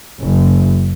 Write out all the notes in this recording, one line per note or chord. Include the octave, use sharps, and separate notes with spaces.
F#1